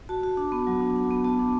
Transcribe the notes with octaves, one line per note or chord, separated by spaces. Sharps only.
F#4 A5
F#4
D4
B3
F#3
D4
D4
B3
B3 A5
D4